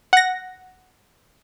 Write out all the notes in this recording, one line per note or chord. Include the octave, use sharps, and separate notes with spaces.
F#5 A#6